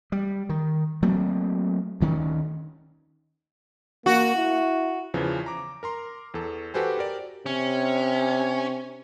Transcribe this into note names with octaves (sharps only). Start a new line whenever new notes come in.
G3
D#3
F#3 A3 A#3 C4
D2 D#3 C#4
A#3 F#4
E4
E2 C#3 E3 F3
A#5 D6
A#4 A#5 C6
E2 A4
F#4 G4 A4 B4 C5 G#5
G4 A#4 D5
C3 C#4